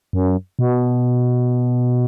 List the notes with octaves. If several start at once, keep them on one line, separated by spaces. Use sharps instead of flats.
F#2
B2